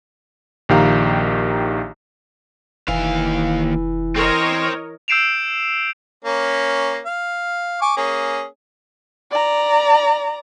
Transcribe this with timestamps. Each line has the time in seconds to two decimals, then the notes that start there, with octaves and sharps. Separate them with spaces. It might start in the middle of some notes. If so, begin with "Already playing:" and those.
0.69 A#1 D#3 G4 F5 A#5
2.88 F1 D#2 E3 F5
4.16 C4 A#4 C5 C#5 D#5
5.08 E6 G6 C7 D7 E7 F7
6.25 A#3 C#4
7.06 F5
7.81 G#5 C#6 D6
7.97 A#3 C#4 G#4
9.31 D5 A#5